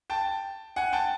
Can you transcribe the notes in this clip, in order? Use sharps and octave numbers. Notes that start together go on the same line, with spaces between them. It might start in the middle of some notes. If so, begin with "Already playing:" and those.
G5 A5
F#5 G#5
G5 A5